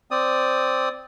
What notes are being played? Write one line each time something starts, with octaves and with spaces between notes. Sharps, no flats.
C4 D5 D#6